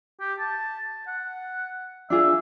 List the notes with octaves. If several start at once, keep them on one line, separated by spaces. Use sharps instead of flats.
G4
A5
F#5
D4 F4 G#4 E5